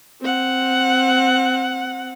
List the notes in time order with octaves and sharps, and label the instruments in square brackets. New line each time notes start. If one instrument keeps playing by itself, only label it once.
[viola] C4 F#5